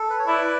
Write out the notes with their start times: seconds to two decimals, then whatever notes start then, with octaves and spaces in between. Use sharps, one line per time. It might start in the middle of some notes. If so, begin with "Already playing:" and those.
Already playing: A4
0.10 B4
0.19 C#5
0.27 E4 B4 D5